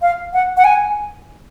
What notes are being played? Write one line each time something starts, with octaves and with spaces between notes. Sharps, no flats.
F5
F#5
F#5
G#5